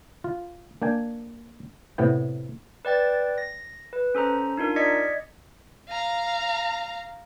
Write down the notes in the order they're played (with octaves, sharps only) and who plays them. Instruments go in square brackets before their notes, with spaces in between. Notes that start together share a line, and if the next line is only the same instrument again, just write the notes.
[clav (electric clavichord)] F4
A#3 D4 G5 G#5
A2 C3 B3 G5
[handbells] B4 D5 G5 A6
A#6
B4
C#4 A4 C5 A#5
D4 D#4 F4 A#4
D5 D#5 G#6 B6 C#7
[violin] F5 A#5